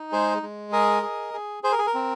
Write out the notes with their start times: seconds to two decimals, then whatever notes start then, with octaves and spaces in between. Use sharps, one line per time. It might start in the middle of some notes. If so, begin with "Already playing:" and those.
Already playing: D#4
0.12 G#3 G#4 C5
0.43 G#3
0.72 G#4 A#4 D#5
1.03 G#4
1.34 G#4
1.63 G#4 C5
1.72 A#4
1.79 G#4
1.87 A#4
1.94 C4